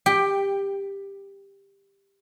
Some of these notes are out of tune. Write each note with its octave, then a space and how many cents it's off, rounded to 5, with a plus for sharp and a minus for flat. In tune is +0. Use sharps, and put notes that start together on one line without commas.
G4 +15 G5 +0